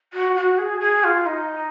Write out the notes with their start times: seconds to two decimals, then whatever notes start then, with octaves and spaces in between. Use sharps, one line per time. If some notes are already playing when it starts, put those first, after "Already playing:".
0.13 F#4
0.35 F#4
0.58 G#4
0.80 G#4
1.03 F4
1.26 D#4